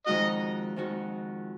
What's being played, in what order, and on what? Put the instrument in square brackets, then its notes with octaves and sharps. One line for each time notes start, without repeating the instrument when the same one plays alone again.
[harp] F2 D#3 G#3 D#4 F#4 [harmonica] D#5
[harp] F2 D#3 G#3 D#4 F#4